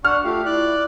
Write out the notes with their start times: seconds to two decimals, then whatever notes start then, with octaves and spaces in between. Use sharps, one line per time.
0.05 D4 F#5 C#6 F6
0.24 A3 F4 G4 F5
0.45 E4 D5 F#6